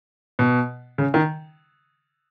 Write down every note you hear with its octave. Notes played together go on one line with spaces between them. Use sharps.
B2
C#3
D#3